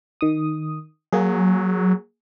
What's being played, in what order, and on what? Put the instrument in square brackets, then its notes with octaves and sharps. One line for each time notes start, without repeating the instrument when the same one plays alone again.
[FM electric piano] D#3 D#6
[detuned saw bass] F#3 [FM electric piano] A#3 G#4